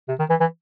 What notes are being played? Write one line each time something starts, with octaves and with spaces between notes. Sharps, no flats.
C3
D#3
E3
E3